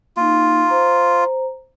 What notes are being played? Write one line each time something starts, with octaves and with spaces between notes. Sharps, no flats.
A#3 D#4 F4
C5 A#5